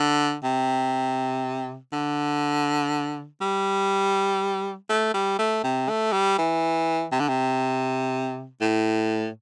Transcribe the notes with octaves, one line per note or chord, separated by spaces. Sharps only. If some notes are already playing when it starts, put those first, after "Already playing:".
Already playing: D3
C3
D3
G3
A3
G3
A3
C3
A3
G3
E3
C3
D3
C3
A2